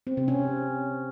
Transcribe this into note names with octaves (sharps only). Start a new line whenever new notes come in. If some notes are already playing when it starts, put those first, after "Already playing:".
C4
C3
C#4